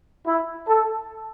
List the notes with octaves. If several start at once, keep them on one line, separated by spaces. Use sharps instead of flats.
E4
A4